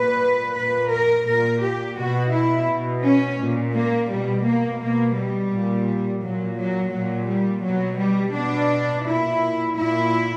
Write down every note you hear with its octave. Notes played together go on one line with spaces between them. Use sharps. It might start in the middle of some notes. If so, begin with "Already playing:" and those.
Already playing: A#2 B4
A#2 B4
A#4
A#2 A#4
G4
B2 F#4
E4
B2
C#4
A#2
A#3
B2 G3
A#3
B2 A#3
G3
A#2
A#2 F#3
F#3
A#2 F#3
G3
B2 F#3
G3
B2 D4
A#2 E4
A#2 E4